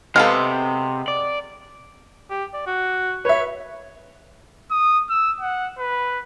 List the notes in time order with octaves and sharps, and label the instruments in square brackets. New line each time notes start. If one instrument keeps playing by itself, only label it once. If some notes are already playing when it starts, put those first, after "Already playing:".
[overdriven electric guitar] C3 [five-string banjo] G#3 B3 A4 [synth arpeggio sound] F5 F6
[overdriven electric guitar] D5
[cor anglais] G4
D5
F#4
[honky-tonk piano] B4 E5 [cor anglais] C#5
[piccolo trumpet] D#6
E6
F#5
B4